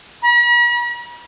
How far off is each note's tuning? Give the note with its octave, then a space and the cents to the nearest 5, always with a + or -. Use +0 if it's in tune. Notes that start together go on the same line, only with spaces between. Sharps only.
B5 -45